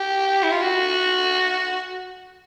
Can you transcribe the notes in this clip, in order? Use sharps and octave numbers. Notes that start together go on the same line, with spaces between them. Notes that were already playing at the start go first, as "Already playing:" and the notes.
Already playing: G4
E4
F4
F#4